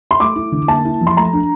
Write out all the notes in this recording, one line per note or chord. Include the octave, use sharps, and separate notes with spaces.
C6
A3 D6
E4
D3
A#3 A5
E4
F3
C6
A3 A#5
D4